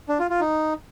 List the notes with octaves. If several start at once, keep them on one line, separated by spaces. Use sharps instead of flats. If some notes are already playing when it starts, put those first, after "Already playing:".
D4
F4
F4
D#4